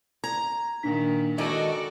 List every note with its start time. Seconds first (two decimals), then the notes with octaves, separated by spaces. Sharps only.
0.24 A#5 G#6
0.83 A#2 D#3 D4 D#4 B6
1.38 D#3 G#3 F#4 A4 D5 D#5 G#6 A#6